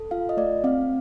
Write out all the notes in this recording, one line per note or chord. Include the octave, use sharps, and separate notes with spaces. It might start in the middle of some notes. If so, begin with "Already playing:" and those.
Already playing: A4
F4 F5
D#5
A3 D5
C4 F5